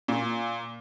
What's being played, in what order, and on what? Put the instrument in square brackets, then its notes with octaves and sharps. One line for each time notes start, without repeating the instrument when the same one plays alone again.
[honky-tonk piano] A#2